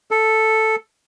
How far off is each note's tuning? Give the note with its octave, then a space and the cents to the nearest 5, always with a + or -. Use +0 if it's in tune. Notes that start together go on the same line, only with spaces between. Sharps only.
A4 +0